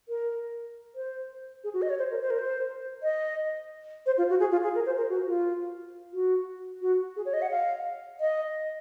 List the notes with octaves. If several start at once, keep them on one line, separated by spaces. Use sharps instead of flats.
A#4
C5
G#4
F#4
D#5
C#5
C5
A#4
C5
A#4
C5
D#5
C5
F4
F#4
G#4
F4
G#4
A#4
C5
A#4
F#4
F4
F#4
F#4
G#4
C#5
D#5
F#5
F5
D#5